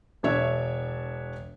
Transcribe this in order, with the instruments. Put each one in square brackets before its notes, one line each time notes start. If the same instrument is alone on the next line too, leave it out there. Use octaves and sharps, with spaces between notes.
[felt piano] E1 D4 C#5 E5